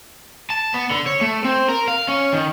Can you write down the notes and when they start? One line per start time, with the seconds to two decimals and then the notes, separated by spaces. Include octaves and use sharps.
0.50 A5
0.74 B3
0.91 D3
1.06 C#5
1.21 A3
1.44 C4
1.69 A#4
1.88 F5
2.08 C#4
2.33 D#3